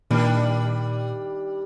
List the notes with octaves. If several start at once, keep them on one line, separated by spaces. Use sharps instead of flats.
A#2 D#3 G3 D4